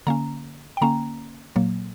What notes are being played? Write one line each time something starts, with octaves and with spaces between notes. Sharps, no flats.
D3 A#3 C#4 A#5
G5
D3 A#3 C#4 A#5
A#2 F#3 A#3